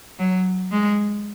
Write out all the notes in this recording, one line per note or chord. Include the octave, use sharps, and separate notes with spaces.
F#3
G#3